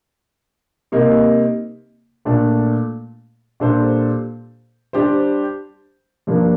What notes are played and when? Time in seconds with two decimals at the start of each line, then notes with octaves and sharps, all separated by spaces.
0.92 C3 G3 A#3 D#4
2.25 A#2 A3 D4 A4
3.60 A#2 G3 D4 A4 C5
4.93 G3 D4 G4 C5
6.27 G2 F3 A#3 D4